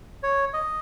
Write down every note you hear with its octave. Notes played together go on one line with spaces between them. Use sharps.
C#5
D#5